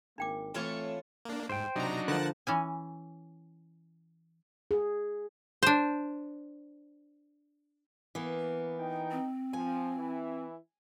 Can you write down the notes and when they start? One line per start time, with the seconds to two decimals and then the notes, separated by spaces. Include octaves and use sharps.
0.18 G#1 A#3 D4 G5 D6
0.55 A2 E3 A3 C4 F4 A4 C#5
1.25 A#3 D4
1.49 G#2 C5 G5
1.76 C3 F#3 D4 D#4 A#5
2.08 D3 F3 A#4 F#5 A5 F#6
2.47 E3 C#4 G#5
4.71 G#4
5.63 D4 C5
8.15 E3 A#3 B3
8.79 D#4 G5
9.12 C4
9.53 F3 G#5
9.97 E3 E4